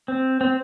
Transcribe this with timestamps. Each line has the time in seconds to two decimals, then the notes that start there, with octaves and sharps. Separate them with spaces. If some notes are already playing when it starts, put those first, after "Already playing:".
0.08 C4
0.41 C4